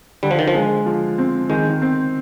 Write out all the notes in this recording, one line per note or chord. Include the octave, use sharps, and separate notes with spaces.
D3 G3
F3
D#3
F3
G#3
F3
C4
D#3 G#3
C4